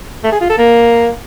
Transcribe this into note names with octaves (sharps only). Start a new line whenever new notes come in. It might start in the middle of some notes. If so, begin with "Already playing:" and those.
A3
G#4
F4
A4
A#3